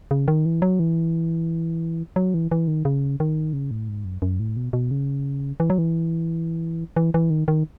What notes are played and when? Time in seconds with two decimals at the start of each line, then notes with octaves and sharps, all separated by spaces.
0.11 C#3
0.28 D#3
0.46 E3
0.62 F#3
0.79 E3
2.16 F#3
2.34 E3
2.51 E3
2.68 D#3
2.85 C#3
3.20 D#3
3.53 C#3
3.71 A2
3.89 G#2
4.05 F#2
4.22 F#2
4.40 A2
4.57 B2
4.73 B2
4.91 C#3
5.60 E3
5.70 F#3
5.78 E3
6.96 E3
7.14 E3
7.30 D#3
7.48 D#3